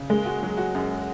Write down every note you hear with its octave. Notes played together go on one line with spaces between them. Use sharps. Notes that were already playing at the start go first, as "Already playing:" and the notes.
Already playing: C#3
G#3 A#3
F#4
F#3
F#4
F#2